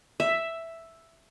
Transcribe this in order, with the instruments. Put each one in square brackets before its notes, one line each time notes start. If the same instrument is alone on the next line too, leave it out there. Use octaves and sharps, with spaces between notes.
[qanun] E5